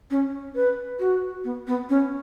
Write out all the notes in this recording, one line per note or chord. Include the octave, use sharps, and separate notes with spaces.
C#4
B4
F#4
B3
B3
C#4